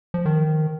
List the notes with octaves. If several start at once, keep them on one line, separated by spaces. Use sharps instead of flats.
F3
D#3